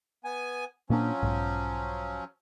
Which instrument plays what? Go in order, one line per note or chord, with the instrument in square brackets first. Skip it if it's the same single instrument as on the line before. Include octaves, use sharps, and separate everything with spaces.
[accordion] B3 G#5
[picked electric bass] A#2 A#3 D4 [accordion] F3 F#3 C#4
[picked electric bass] B1 G#2